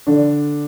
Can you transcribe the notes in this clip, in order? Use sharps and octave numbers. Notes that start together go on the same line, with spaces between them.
D3 D4